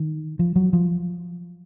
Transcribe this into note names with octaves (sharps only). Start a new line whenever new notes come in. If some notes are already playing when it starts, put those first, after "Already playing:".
Already playing: D#3
F3
F#3
F3